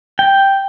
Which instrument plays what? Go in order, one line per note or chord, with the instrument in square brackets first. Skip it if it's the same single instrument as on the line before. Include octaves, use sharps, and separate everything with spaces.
[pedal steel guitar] G5